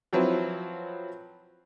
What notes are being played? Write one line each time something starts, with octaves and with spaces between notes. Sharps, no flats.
F3 F#3 C4 E4 B4